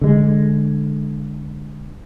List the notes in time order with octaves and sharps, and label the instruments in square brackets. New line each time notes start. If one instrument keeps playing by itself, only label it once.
[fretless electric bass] D3 G#3